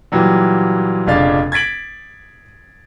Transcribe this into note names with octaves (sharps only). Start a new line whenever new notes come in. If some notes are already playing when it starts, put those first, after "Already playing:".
A#2 E3 F#3 G3
F1 A#2 C#3 D4 F5 A6
G#6 A6 B6 D7 F#7